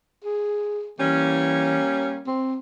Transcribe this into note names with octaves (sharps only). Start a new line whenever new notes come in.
G#4
E3 G3 A#3 C#4
C4